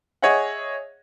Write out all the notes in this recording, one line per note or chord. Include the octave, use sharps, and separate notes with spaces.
G#4 C#5 D#5 E5 F#5